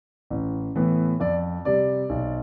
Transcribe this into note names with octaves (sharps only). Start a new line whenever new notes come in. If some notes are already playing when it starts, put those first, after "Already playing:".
A1
A2 E3 B3
F2 D5
C3 G3 D5
B1